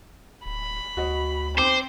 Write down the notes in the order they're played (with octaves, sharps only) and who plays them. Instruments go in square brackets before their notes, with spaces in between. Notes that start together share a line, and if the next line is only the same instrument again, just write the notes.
[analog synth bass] D1 [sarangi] B5
[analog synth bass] D2 [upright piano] F#4 D#5
[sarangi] C4 [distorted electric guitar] C5 [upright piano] D6